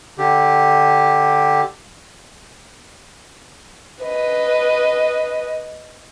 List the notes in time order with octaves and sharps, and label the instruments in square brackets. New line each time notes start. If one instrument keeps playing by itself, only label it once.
[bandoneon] D3 G4
[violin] B4 D#5